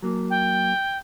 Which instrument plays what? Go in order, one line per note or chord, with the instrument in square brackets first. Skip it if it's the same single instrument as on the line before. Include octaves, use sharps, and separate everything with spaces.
[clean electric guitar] F#3 A#3
[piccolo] G5